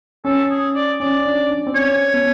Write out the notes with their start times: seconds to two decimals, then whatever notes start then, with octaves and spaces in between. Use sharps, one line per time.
0.25 C#4 A4
0.50 G#4
0.75 D5
1.00 C#4 D5
1.26 D4
1.50 D4
1.67 C4
1.75 C#4 C#5
2.14 B3